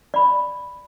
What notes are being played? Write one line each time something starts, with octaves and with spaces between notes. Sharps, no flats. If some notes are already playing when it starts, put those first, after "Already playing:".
D5 B5